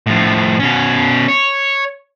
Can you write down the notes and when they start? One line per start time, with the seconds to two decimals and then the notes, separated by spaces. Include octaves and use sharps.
0.07 A2 F3
0.59 B2 C#4
1.28 C#5